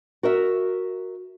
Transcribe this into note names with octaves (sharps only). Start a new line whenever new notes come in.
F#4 A#4 E5